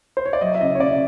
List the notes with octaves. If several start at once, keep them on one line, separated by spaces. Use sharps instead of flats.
C5
C#5
D5
F#3 D#5
E5
C#3 D#5
C#5
C#3 D5